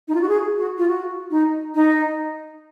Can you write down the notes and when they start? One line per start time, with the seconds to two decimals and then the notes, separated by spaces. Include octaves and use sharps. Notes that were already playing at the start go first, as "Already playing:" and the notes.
0.08 D#4
0.15 F4
0.21 F#4
0.29 G#4
0.58 F#4
0.78 F4
0.88 F#4
1.31 D#4
1.75 D#4